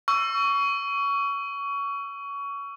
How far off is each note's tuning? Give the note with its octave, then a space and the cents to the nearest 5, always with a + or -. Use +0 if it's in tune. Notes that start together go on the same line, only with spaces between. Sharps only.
C#6 +25 E6 +30